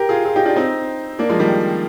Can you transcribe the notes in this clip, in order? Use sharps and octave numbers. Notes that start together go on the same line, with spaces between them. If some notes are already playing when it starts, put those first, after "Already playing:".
Already playing: G4 A#4
F4 G#4
F4 G#4
D#4 G4
D4 F4
C4 D#4
A#3 D4
F3 G#3
D#3 G3